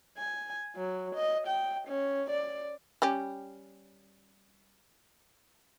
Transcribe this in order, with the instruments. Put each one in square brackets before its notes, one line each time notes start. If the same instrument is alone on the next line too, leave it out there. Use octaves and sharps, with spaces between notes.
[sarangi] G#5
F#3
D#5
G5
C#4
D5
[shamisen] G3 C#4 G4